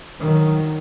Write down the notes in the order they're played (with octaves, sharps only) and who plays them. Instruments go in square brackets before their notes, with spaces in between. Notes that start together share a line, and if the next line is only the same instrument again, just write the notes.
[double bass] D#3 F#3